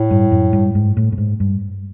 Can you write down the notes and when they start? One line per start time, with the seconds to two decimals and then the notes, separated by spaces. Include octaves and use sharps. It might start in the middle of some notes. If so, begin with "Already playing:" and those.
Already playing: A2
0.11 G2
0.32 F#2
0.53 G2
0.75 G#2
0.97 A2
1.12 A2
1.18 G#2
1.40 G2